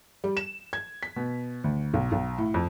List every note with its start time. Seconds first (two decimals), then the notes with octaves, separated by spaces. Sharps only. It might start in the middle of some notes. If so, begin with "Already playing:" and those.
0.24 G3
0.37 E7
0.73 G#6
1.03 B6
1.16 B2
1.64 D2
1.94 B1
2.12 B1
2.38 A2
2.54 F2